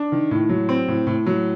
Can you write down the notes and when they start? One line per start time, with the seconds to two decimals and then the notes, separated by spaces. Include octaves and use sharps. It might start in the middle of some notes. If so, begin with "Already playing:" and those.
Already playing: D4
0.12 D#3
0.31 A2
0.49 F#3
0.69 C4
0.88 A2
1.07 A2
1.26 F#3